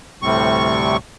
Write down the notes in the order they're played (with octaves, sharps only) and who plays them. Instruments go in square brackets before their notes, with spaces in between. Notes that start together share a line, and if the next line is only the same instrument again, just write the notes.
[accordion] D2 A2 C3 G3 C4 C#6